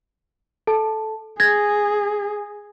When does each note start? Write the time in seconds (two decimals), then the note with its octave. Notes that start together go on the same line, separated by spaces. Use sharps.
0.67 A4 A5
1.40 G#4 G#6 A#6